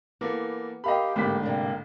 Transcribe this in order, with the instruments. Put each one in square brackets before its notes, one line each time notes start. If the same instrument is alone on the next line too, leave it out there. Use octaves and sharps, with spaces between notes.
[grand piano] E3 A#3 A4 [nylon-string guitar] B3
[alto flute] G4 [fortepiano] A#4 F5 G5 [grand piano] D#5 B5
[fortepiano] A1 D3 [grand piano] G#2 B6 [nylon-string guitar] A#3 C4 [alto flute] G4
[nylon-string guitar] C3 D4 [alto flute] A#3